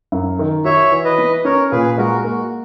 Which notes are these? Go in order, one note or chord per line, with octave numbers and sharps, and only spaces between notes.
F#2
D#3
F#4 C#5 E5
E3
B4 D#5
B3
C#4 A#4 C#5
A#2 G#4 B4
G#3 F#4 A#4
A#3 F#4